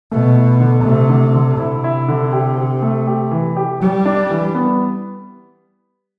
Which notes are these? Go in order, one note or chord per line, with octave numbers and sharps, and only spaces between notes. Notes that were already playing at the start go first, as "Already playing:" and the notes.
B2 A3
E4
D3
C3 A3
D3
D3
C3 E4
E4
D3
G4
G4
A3
G4
E3
G4
G3 G4
D4
E3
B3